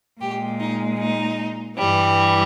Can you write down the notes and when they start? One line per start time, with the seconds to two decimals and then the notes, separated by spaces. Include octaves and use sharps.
0.20 A#2 G#3 G4
0.60 D#4
0.98 D#4
1.78 G2 E3 G3